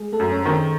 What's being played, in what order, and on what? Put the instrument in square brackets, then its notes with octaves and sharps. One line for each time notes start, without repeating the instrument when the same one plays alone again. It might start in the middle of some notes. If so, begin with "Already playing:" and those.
Already playing: [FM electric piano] G#3 G#4
A3 A4
[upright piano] F#2
[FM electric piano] C#4 C#5
[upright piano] D#3 [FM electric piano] C5
[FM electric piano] C#4 C#5